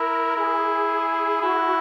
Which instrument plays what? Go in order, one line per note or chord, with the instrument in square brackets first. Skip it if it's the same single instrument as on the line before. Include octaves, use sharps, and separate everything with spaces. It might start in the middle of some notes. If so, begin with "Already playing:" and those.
Already playing: [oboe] E4 [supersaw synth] A#4
[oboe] E4 [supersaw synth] G#4
[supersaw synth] G#4
[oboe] E4 [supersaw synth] F#4